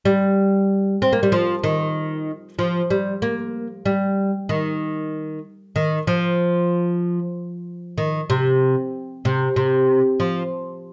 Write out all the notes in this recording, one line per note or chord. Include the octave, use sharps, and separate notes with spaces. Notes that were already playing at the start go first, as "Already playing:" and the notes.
G3
C4
A#3
G3
F3
D#3
F3
G3
A#3
G3
D#3
D#3
F3
D#3
C3
C3
C3
F3